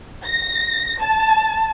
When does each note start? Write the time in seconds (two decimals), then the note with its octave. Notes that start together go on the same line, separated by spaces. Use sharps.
0.25 A#6
1.01 A5